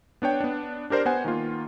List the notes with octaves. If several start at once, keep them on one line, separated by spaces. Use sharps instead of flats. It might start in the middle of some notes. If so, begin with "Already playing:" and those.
B3 D4 C#5 G5
B3 D4
D4 G4 A#4 C5 D5
B3 C5 F#5 G#5
D#3 A#3 F4